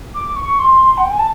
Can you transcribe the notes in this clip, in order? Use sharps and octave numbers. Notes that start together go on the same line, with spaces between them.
D6
C#6
C6
F#5
G5
G#5
A5